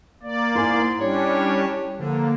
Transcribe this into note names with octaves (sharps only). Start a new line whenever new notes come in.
A#3 D5
G#2 E4 A#4 G#5 C6
G3 C#4 D4 G4 C#5
D3 F3 A#3